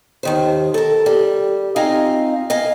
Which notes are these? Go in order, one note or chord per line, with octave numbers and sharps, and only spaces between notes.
D#2 D#3 C5
A4 A#4
G3
C4 D#4 F4 D#5 F5 G#5
D#5 F5 G#5